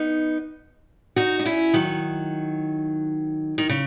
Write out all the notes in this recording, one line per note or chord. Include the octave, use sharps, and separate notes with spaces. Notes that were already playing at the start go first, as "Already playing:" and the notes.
Already playing: B3 D#4
D#4 F#4
D#4
C#4 E4
D#3 F#3
D#3
C#3